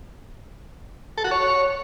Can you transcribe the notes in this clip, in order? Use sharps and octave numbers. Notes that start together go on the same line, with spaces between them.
A4
F#4
C#5